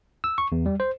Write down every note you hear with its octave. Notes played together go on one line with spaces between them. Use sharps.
E6
C#6
E2
G3
C5